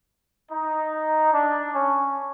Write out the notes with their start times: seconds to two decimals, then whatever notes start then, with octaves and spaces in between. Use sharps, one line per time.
0.51 D#4
1.32 D4
1.73 C#4